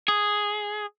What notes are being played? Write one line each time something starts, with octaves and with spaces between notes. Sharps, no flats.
G#4